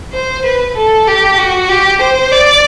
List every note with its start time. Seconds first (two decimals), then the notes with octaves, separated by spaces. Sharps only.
0.13 C5
0.46 B4
0.77 A4
1.08 G4
1.38 F#4
1.70 G4
2.01 C5
2.32 D5